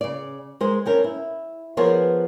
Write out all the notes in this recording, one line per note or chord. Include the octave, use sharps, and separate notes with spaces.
C#3 D5
G#3 A#4 C5
C4 C#4 A#4
E4
F3 B3 G#4 A#4 C5 C#5